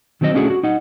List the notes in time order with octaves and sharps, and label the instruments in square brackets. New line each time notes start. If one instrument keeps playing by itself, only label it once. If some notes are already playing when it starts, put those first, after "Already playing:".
[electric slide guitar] D#3 F#3 C4 G4 D#5
A3 C#4 D4 E4 F#4 G#4
F#4
D#4 D#5 F#5